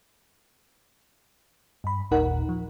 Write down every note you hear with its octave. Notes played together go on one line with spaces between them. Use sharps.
G2 B5
G#1 D#2 A#2 D#4 A#4 F#5
F3